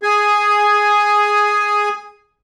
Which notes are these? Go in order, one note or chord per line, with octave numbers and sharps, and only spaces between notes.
G#4 G#5